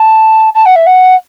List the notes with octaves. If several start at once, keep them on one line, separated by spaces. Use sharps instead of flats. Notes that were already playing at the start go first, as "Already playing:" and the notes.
Already playing: A5
A5
F#5
E5
F#5